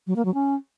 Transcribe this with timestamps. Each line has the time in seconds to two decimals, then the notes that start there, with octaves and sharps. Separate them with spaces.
0.07 F#3
0.16 A#3
0.25 F#3
0.34 C#4